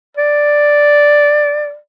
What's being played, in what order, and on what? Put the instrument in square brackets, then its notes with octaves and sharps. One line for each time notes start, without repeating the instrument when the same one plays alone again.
[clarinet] D5